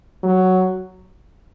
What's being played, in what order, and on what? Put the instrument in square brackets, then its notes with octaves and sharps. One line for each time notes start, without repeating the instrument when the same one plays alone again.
[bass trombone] F#3